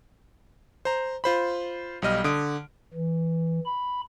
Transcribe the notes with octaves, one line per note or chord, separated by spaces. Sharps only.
C5 A#5
F4 C5 B5
B1 G3 D#5 F6
D3 D#6 D7
E3
B5